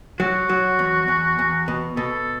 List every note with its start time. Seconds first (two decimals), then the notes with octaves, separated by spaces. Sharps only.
0.20 F#3 F#4
0.50 F#3
0.79 E2
1.08 E2
1.39 E2
1.68 B2
1.97 B2 A4